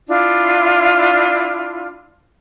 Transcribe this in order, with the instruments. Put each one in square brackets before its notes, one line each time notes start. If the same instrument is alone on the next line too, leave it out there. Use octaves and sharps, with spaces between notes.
[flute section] D4 E4 F4